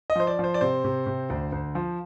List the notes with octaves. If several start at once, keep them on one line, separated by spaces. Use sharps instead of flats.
D#5
F3 C5
D5
F3 C5
D5
C3 C5
C3
C3
D2
D2
F3